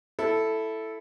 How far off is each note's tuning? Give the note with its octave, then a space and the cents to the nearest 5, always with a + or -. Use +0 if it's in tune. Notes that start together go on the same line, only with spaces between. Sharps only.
E4 +0 A4 +0